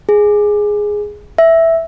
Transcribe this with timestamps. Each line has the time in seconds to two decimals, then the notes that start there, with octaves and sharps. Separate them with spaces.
0.09 G#4
1.38 E5